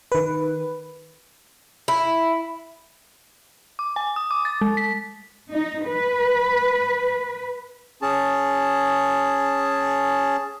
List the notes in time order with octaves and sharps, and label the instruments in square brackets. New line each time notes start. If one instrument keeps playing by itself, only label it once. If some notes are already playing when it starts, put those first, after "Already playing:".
[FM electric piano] D#3 B4
[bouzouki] E4
[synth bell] D6
G#5
D#6
D6
A6
G#3
B6
[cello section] D#4
B4
[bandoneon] C#4 G#4 A5